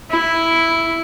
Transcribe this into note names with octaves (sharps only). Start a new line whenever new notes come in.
E4